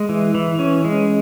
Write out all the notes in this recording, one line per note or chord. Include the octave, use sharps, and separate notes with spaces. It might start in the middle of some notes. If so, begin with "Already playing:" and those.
Already playing: G#3
E3
E3
C#4
G#3